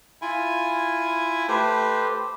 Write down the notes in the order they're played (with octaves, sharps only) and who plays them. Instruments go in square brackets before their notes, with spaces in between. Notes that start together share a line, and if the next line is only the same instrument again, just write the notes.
[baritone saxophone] E4 [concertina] F4 G#5
[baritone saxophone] A3 [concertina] G4 B4 C5